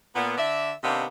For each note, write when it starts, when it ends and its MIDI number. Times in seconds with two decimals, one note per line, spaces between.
0.15 0.34 46
0.15 0.34 59
0.37 0.72 50
0.37 0.72 74
0.37 0.72 76
0.83 1.05 48
0.83 1.05 51
0.83 1.05 58
0.83 1.05 59
0.83 1.05 62